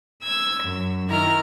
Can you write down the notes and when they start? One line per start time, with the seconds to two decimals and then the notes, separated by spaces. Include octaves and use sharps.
0.22 E6 G#6
0.63 F#2
1.08 D#3 E4 A#5 F6